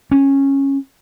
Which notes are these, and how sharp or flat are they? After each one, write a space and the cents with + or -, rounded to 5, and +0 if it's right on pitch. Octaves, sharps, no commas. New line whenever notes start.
C#4 -10